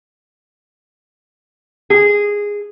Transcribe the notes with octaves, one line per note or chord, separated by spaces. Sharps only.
G#4